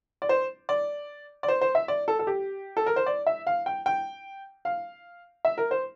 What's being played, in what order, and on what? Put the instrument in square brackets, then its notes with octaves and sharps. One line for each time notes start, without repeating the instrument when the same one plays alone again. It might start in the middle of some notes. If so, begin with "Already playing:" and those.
[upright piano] D5
C5
D5
D5
C5
C5
E5
D5
A4
A4
G4
A4
A#4
C5
D5
E5
F5
G5
G5
F5
E5
A#4
C5